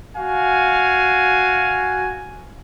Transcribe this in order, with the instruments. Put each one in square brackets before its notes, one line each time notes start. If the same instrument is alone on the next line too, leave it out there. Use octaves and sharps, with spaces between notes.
[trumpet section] F#4 F5 G#5